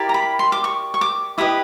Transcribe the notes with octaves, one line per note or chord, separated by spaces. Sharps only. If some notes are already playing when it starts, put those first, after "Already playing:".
Already playing: E4 G4 A#4 D5
A#5
B5
C6
D6
C#6
C#6
D6
E4 G4 B4 D#5 D#6